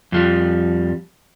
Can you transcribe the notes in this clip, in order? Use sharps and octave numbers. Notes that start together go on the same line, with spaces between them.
F2 F3 G3